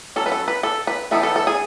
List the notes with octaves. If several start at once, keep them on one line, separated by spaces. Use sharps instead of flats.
F#3 C#4 A4
B4
A4
B4
A4
B4
E3 B3 D#4 A4
A4
A4
G#4